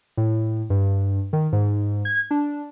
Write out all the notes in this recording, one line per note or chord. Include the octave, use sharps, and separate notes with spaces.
A2
G2
D#3
G#2
G#6
D4